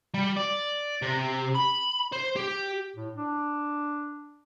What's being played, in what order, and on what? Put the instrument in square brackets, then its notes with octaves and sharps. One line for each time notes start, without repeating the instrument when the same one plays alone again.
[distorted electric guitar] G3
D5
C3
B5
C5
G4
[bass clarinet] A2
D4